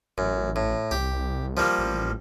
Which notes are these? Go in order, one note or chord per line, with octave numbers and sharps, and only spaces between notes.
A1 F#2
A2
C2 G4
F3 G3 A#3
A1